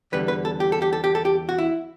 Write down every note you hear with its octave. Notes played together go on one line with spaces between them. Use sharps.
E2 D3 G3 B3 B4
B4
A4
G4
A4
G4
A4
G4
A4
G4
F#4
E4